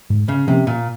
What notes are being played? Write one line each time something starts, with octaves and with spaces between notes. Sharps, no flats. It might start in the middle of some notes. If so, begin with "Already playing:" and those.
G#2
C#3
C3 F3 A#3 C#4
A#2